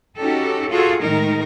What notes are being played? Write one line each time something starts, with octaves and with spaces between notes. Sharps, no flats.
C#4 D#4 F#4 G4 A4
F4 F#4 G#4 A4
A2 D#3 G#3 D#4 A#4